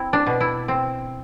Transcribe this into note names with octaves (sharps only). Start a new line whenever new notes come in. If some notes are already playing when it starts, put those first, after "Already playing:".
Already playing: C4 E4
D4
B2
E4
C4